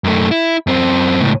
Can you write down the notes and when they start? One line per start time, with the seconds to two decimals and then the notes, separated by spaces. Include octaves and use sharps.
0.04 F#2 A3
0.31 E4
0.67 F#2 C4
1.21 C#2 A2